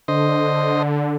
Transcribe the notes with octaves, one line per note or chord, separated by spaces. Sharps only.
D3 C5 D#5